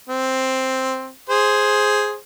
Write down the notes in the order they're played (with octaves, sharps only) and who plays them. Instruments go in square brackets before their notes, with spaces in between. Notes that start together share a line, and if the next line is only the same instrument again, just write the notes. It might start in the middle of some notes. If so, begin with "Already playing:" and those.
[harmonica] C4
G#4 C5